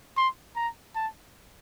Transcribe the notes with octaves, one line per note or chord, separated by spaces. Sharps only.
C6
A#5
A5